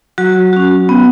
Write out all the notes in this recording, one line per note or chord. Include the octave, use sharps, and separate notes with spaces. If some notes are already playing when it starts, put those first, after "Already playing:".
F#3 F#4
C#4 F#4
B3